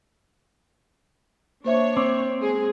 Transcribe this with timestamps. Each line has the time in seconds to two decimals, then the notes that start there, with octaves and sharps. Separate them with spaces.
1.65 A#3 D4 C5 C#5 E5
1.97 C4 D6
2.40 G#3 G#4